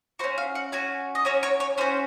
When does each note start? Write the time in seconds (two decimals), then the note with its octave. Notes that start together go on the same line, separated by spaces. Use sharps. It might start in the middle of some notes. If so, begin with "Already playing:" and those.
0.19 F#4 C5
0.24 C#4
0.38 F5
0.55 F#5
0.72 C#4 F#4 G#5
1.15 D#5
1.25 C#4 F#4 C#5
1.43 C#5
1.60 C#5
1.78 C#4 F#4 C5